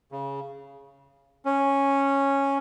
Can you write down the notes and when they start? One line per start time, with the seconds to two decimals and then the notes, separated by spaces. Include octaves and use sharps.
0.12 C#3
1.45 C#4